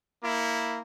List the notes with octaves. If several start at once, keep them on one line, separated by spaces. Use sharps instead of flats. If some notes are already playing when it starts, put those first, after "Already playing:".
A#3 E4